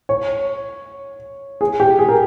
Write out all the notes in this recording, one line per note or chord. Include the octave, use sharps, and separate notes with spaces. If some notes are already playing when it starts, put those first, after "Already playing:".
C#5
G#4
G4
G#4
A#4